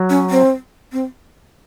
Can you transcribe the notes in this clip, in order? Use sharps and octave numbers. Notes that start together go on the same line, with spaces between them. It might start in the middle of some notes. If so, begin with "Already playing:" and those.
Already playing: F#3
C#4
C4
C4